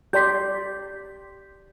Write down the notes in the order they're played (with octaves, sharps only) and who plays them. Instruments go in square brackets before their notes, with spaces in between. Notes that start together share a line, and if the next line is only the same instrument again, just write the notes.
[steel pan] G4 D5 C6 [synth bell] G6 B6